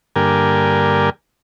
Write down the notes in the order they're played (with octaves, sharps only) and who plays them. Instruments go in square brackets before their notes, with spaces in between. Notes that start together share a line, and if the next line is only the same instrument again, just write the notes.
[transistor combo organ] G2 D3 A#3 G4 A#4 G#5